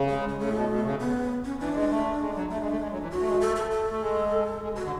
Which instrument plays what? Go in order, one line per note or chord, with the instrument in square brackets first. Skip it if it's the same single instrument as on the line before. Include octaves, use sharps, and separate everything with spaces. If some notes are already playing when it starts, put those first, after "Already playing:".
Already playing: [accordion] C#3
[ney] G#3
G#3
[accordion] C#3 [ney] A3
[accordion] A2
B2
B2
C#3
[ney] B3
C#4
[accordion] E3 [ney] D4
[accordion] G#3
A3
G#3
F#3
[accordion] A3 [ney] D4
[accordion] G#3
A3
G#3
F#3
E3
[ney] F#4
[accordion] A3
G#3
A3
[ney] A4
A4
A4
[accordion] A3
G#3
G#3
B2
[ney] F#4
[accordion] D3